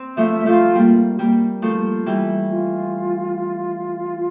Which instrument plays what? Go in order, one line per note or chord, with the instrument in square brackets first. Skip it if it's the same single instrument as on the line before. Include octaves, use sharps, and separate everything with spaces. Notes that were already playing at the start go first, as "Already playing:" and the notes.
Already playing: [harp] C4
[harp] F3 A3 [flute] E5
[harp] F3 A3 [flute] F4
[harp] G3 A#3
G3 A#3
F3 A3
E3 G3
[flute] F4